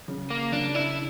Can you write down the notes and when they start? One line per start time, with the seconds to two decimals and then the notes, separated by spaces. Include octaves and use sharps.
0.08 C#3
0.30 A#3
0.52 C#3 D4
0.75 E4